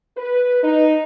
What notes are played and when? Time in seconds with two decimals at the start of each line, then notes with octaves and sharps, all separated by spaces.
0.17 B4
0.63 D#4